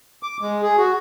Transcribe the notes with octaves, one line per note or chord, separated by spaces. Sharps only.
D6
G#3
G#4
F#4